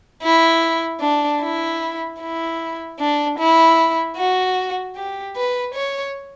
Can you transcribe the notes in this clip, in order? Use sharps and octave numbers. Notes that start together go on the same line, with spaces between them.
E4
D4
E4
E4
D4
E4
F#4
G4
B4
C#5